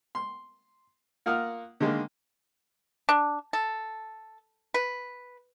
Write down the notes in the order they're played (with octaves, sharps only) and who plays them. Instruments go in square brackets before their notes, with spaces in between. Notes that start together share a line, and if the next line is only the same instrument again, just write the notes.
[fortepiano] C6
A#3 F4 A#4 F#5 D#6 F6
D3 D#3 G#3 A#3
[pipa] D4
A4
B4